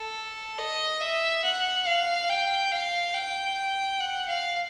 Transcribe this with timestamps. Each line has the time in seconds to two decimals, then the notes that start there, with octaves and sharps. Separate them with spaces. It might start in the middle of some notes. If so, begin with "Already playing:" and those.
Already playing: A4
0.58 D#5
1.01 E5
1.44 F#5
1.87 F5
2.29 G5
2.72 F5
3.15 G5
4.00 F#5
4.28 F5